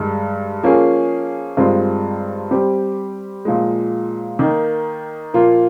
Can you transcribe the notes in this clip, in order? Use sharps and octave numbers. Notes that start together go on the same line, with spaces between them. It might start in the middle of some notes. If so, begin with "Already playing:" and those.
Already playing: G2 D#3 G#3
F3 A#3 C#4 G#4
G2 D#3 G#3 C4 F4
G3 C4 G4
A#2 F3 G#3
D#3 A#3 D#4
A#2 F3 A#3 F4